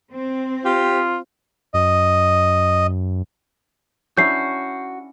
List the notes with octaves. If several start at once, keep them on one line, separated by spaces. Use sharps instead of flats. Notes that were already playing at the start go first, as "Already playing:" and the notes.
C4
F4 G4
F#2 D#5
C#4 D4 E4 F#4 G6 C7